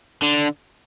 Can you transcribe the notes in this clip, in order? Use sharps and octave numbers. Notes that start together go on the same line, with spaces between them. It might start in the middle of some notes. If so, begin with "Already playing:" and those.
D3